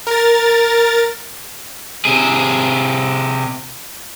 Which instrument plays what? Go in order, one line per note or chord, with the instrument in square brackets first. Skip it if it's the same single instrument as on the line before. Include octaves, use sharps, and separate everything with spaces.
[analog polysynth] A#4 A6
[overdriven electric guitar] C3 G#4